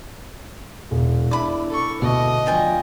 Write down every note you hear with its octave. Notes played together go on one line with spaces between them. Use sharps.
E1
D4 E4 B5 D6
A4 C#6
D2 B2 D#5
F3 D4 F4 G5 G#5